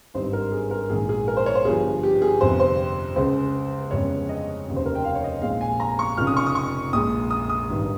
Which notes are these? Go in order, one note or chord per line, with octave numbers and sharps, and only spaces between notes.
G#1 G2 G3 C4 D#4 C5
A#4
G#4
A#4
A#1 G#2 D#3 G#4
G#4
A#4
C5
C#5
C5
G1 G2 F3 G#4
G4
G#4
G1 F2 C3 C5
C5
C#2 C#3 G#3 C5
G1 F2 C#3 G#3 C#5
D#5
F1 D#2 C#3
C5
A#4
G5
F5
C#5
D#5
A#1 A#2 G#3 C4 D#4 F5
G#5
A#5
C#6
F1 F2 C#3 F3 F6
D#6
C#6
D#6
C#6
A#1 A#2 G#3 D#6
D#6
D#6
G#1 G2 D#3